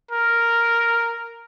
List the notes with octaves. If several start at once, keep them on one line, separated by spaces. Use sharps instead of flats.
A#4